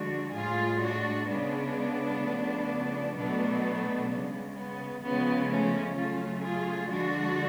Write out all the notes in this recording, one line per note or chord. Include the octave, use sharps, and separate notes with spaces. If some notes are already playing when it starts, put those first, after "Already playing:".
Already playing: D3 F3 G#3 D4 F#4
A2 G#3 F4 G#4
D4 F#4
C#3 G#3 B3 D4
C#3 F3 A3
B2 F#3 A3 B3 D4
C#3 G#3 B3
B3
C#3 F3 G#3 B3
A3 C#4
C#3 F#3 A3 C#4 F4
F4 G#4
D3 F3 G#3 D4 F#4